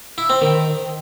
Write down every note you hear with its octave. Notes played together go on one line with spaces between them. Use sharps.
E4
C4
D#3